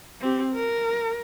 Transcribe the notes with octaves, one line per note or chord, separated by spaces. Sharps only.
C4 G4
A#4